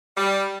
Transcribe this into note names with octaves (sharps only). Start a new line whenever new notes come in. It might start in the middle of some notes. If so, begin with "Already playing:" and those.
G3